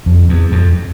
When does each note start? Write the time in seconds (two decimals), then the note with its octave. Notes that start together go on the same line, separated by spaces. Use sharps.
0.06 F2
0.29 E2
0.52 F2